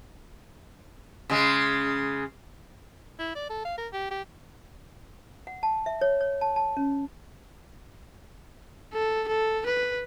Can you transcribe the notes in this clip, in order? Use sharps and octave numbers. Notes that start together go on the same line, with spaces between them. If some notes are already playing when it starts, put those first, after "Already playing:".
C#3 G#3
E4
D5
A4
F5
A#4
G4
G4
F#5
A5
E5
C#5
C#5
A5
A5
C#4
A4
A4
B4